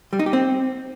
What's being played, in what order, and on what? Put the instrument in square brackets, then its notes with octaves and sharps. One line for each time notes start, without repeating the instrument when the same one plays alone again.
[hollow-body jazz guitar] G3
D#4
G4
C4